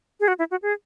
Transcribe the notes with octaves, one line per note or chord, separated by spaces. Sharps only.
G#4
F#4
E4
F#4
G#4